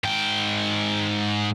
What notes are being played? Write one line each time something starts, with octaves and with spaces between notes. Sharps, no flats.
G#2 G5